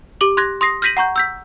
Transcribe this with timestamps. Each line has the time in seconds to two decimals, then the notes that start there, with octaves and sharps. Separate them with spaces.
0.21 G4 D6 F#7
0.37 C6 F#6 G#6 A#6
0.61 C6 D#6 A#6 C7
0.82 F6 G6 A#6 B6 D#7 F#7
0.97 F#5 A#5 C#6 G6
1.16 E6 G6 B6